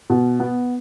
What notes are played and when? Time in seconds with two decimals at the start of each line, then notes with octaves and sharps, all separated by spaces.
0.10 B2
0.40 B3